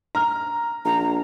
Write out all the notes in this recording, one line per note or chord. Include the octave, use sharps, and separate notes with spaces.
A#5 F6
A#1 A#5